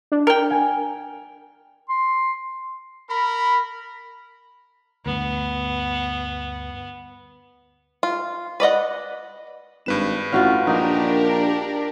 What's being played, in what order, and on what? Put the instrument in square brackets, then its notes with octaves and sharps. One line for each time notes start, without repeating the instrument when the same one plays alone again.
[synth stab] D4
[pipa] A#4 G5
[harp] G#5
[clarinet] C6
[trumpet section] A#4 B5
[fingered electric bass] D2 G2 [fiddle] B3
[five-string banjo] F4
B4 D5 D#5 F#5
[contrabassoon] G#1 [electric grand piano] G2 B4 E7
[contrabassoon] A1 [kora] F4 F#4 F5
[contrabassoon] A#1 [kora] A#3 D#4 [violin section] D4 G4 A#4